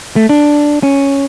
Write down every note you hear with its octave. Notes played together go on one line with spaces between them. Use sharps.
A3
D4
C#4